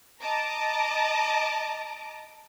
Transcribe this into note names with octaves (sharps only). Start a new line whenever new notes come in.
D#5 A5 A#5 D6